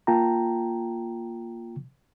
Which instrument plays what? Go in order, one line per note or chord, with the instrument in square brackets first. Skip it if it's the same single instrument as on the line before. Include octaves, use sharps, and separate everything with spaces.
[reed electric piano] A#3 F4 G5 A5 A#5